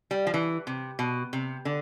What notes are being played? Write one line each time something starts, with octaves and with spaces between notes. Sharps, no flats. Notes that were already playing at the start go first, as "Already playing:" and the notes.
G3
F3
E3
C3
B2
C3
D3